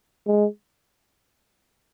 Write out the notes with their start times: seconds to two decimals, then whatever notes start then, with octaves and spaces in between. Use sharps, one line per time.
0.27 G#3